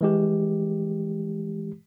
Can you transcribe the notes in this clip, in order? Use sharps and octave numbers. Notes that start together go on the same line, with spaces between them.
E3 G#3 G4